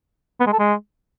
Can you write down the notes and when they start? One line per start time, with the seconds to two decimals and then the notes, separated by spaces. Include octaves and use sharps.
0.40 B3
0.46 G#3
0.53 A4
0.59 G#3